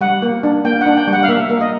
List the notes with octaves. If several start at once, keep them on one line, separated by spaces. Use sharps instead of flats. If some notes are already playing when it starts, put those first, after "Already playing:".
G3 F#5
A#3
D4
A#3 G5
F#5
D4
G5
G3
F#5
F5
A#3 E5
A#3
D#5